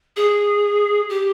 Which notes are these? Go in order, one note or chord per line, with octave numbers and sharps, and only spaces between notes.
G#4
G4